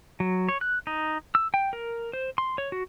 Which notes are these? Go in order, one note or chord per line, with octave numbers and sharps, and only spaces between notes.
F#3
C#5
F#6
D#4
E6
G5
A#4
C5
C6
C#5
F#4